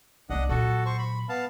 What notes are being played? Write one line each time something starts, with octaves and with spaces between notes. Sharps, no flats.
C2 A#3 D4 D#5 F#5
A#2 F#3 F#4 A4
C5 C#6
B5
B3 F5 A5